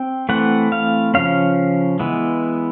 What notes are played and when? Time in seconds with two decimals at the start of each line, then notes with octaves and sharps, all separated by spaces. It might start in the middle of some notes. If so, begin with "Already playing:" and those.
Already playing: C4 G5
0.29 E3 A3 C4 F#5
0.72 F5
1.14 C#3 F3 A#3 C#4 F5
1.99 E3 G#3 B3